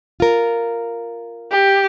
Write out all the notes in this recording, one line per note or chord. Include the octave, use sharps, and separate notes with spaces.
F4 A#4
G4